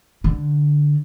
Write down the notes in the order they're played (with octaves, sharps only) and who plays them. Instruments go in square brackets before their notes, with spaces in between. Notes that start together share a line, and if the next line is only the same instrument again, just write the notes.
[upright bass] D3